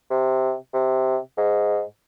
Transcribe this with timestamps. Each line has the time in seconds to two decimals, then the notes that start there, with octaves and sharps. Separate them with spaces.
0.10 C3
0.73 C3
1.37 G#2